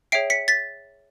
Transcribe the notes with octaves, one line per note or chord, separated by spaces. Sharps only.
G#4 C#5 E5 G5 C7 D7
B6 C#7
A6 B6